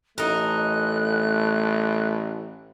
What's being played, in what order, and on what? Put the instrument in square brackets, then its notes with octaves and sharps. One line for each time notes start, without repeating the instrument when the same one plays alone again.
[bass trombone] A1 [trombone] A3 [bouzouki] D#4 A#4 [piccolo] F#6